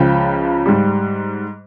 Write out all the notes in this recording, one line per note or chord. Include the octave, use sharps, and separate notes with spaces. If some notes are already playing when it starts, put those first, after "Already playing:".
Already playing: C#2 C#3 F3 G5
G#2 G3